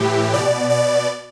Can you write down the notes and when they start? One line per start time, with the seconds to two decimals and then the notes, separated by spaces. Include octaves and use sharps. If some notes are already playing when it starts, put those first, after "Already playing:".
Already playing: A2 E3 G4
0.33 B2 D5
0.70 D5